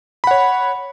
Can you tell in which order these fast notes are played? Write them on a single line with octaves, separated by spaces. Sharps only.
B5 F#5 C#5